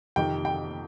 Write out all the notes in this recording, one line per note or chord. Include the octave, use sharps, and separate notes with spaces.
F2 C3 D#3 G5
G5